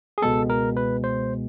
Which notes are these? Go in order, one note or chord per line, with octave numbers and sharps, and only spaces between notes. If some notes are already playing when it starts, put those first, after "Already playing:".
G#4
C#2 B2 G#3 B3 A4
A#4
B4
C5